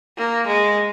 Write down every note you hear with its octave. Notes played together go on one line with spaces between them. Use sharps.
A#3
G#3